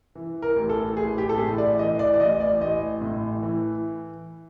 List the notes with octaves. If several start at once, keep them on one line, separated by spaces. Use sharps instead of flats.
E3
A#4
A1
A4
A1 G#4
G4
A4
A2 G#4
D5
E3 D#5
D5
D5
A1 D#5
D5
A1 D#5
A2
E3